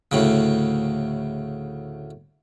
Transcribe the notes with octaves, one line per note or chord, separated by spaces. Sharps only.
D2 A2 C#3